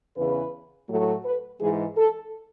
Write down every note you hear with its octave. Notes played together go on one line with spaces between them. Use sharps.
E2 C#3 E3 B4
A2 F#3 A3
B4
G#2 E3 G#3 G#4
A4